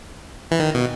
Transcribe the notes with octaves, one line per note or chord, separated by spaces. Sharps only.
E3
D#3
B2